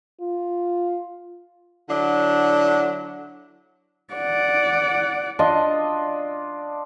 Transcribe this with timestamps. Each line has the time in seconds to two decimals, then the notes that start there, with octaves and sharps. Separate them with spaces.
0.21 F4
1.89 D3 F#3 D4 E4
4.14 D5 F#5
5.39 D4 F4 D#5